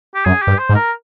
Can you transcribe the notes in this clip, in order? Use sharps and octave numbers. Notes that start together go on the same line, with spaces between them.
G4
F#2 G#4
G4
G2
C5
G#2
A#4